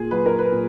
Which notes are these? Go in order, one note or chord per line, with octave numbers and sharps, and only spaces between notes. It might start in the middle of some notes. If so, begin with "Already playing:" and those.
Already playing: A#2 G#4
F#3 B4
A#4
B4
A#2